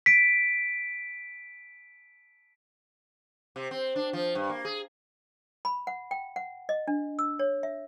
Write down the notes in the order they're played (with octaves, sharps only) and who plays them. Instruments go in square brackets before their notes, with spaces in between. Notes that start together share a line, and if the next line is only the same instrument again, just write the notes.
[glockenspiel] B6 D7
[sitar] C3
C4
D4
F3
G2
A#3
G#4
[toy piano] B5
F#5
G5
F#5
D#5
D4
E6
C#5
E5